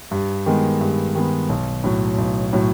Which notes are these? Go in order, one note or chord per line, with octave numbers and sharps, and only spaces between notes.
G2
D#3 G#3 B3
G2
D#3 G#3 B3
B1
A2 F#3
B1
A2 F#3